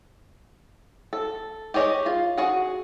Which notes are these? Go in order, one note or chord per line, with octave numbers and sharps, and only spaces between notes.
A4
G4 G#4 C#5 D#5
F4
F#4 G#4 F#5